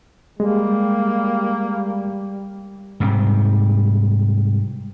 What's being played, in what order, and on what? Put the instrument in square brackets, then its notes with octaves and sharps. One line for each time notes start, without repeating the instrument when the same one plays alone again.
[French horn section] G3 [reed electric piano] G#3 [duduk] A#3
[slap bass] G#2 C3 G3